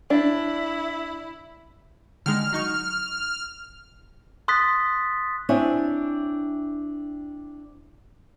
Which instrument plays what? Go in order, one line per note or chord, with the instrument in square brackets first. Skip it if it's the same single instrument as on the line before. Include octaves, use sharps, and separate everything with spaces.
[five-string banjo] D4 [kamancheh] E4
[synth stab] D3 D#3 G#3 [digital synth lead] F6
[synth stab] F#3 D#4 C#6
[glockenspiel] C6 D#6 F#6 A6 B6
[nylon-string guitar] C4 D4 E4 C#5 E5 G#5